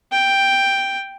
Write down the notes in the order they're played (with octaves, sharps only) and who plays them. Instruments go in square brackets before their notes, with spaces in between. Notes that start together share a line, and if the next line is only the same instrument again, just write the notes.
[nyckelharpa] G5